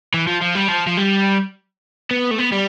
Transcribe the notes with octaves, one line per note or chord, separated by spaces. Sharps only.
E3
F3
F3
G3
F3
F3
G3
B3
A3
B3
G3